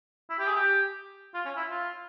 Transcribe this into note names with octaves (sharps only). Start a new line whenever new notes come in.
E4
G4
G#4
G4
F4
C#4
E4
F4